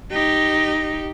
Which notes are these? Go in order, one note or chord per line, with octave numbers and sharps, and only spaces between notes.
D#4 G4